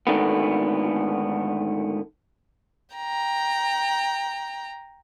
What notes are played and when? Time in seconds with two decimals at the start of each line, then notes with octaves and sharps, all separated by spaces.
0.07 G#2 D3 D#3 A3 B3
2.96 G5 A#5